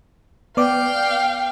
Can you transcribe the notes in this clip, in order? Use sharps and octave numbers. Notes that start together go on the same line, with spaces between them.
B3 D5 F5 G5 D6